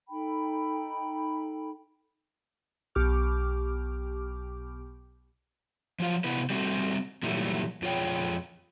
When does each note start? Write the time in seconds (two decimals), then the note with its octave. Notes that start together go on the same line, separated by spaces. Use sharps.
0.09 D#4 A4 G5 B5
2.95 B1 G4 D6 F6
6.00 F3 F#3 F4 F5
6.24 C3 B3 E4 B4
6.50 G3 A3 C4 F#4
7.23 A#2 D#3 E3 F#3 G3 A3
7.82 F2 F4 G#4 C#5 G5